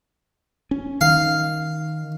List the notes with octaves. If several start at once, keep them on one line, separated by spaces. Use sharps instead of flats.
C#4
D#3 F5